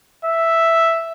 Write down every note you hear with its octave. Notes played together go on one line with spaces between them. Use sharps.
E5